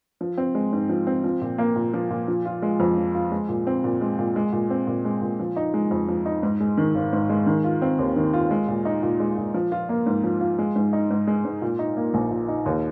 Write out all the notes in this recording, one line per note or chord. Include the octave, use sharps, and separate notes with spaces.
F3
C4
G#3
G#2
F3
C4
F3
A#2
A#3
A#2
F3
A#2
F3
F4
G#3
F2
F3
F4
G#3
A#2
C4
A#2
G#3
A#2
G#3
A#2
C4
A#2
G#3
A#2
F3
D#4
G#3
F2
F3
D#4
G#2
G#3
D#3
G#1
G#2
G#3
D#3
F4
C4
D#2
D#3
F4
G#3
A#2
D#4
A#2
G#3
A#2
F3
F4
A#3
G#2
F3
F4
G#3
G#2
D#4
G#2
G#3
G#2
A#2
D#4
A#3
A#1
A#2
D#4
D#2